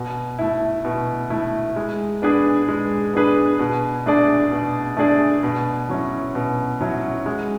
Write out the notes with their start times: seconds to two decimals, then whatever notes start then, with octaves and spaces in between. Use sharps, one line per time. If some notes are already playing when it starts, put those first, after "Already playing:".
Already playing: B2
0.39 A3 E4
0.85 B2
1.30 A3 E4
1.76 G#3
2.22 B3 D4 G#4 B4
2.68 G#3
3.14 B3 D4 G#4 B4
3.59 B2
4.06 A3 D4 G#4 D5
4.51 B2
4.97 A3 D4 G#4 D5
5.43 B2
5.89 F#3 C#4 E4
6.35 B2
6.81 F#3 C#4 E4
7.26 G#3